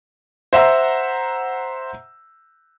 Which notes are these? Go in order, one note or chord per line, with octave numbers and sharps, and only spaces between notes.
C5 E5 F#5 A#5 E6